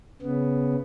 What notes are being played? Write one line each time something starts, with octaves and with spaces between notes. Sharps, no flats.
C#3 B3